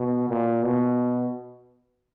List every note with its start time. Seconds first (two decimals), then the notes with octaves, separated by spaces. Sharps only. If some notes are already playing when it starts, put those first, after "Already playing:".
Already playing: B2
0.29 A#2
0.64 B2